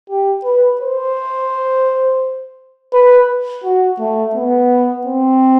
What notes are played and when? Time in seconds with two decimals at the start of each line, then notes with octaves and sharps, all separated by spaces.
0.10 G4
0.44 B4
0.81 C5
2.93 B4
3.64 F#4
3.99 A3
4.35 B3
5.07 C4